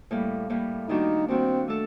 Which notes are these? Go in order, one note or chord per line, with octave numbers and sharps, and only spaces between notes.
A2 G3 A#3
A2 G3 A#3
D#3 G3 A#3 D4 D#4 F#4
D#3 G3 A#3 C4 D4 F#4
A3 D4 A4